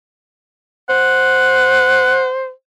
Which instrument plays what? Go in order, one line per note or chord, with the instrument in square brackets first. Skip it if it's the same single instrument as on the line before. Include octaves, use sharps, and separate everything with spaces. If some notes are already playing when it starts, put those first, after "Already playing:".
[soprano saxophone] C5 [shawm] F#5